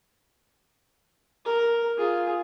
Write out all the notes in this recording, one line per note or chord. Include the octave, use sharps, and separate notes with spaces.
A#4
F4 G#4